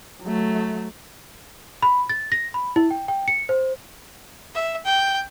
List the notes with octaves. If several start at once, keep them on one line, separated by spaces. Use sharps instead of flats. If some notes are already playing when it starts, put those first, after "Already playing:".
F#3 A3
B5
A6
A#6
B5
E4
G5
G5
C#7
C5
E5
G5